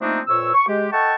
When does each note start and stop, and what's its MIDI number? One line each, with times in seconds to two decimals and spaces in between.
0.01 0.20 53
0.01 0.20 57
0.01 0.20 58
0.01 0.20 60
0.01 0.20 62
0.01 0.20 63
0.27 0.51 41
0.27 0.51 46
0.27 0.51 71
0.27 0.51 73
0.27 0.51 88
0.54 0.65 85
0.68 0.87 56
0.68 0.87 67
0.92 1.15 69
0.92 1.15 75
0.92 1.15 78
0.92 1.15 79
0.92 1.15 81
0.92 1.15 85